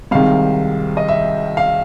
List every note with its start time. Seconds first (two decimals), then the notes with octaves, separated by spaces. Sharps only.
0.11 C2 C3 D#3 G#3 F5
0.97 D#5
1.08 E5
1.57 F5